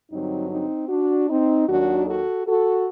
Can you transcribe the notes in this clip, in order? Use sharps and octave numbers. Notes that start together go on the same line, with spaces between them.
G2 D3 F#3 C4 D#4
C4 D#4
D4 F#4
C4 D#4
D#2 D#3 F#3 D4 F#4
F#4 A4
F#4 A4